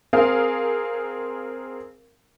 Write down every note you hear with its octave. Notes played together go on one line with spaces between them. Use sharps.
C4 G#4 A#4 F5